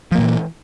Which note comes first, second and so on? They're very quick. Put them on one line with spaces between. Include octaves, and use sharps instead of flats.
F3 A#3 A#2 E3